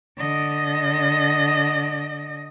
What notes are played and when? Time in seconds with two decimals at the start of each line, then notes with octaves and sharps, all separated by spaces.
0.17 D3 D#5